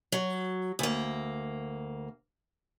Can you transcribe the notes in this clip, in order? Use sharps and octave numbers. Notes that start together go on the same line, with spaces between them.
F#3
D2 A#3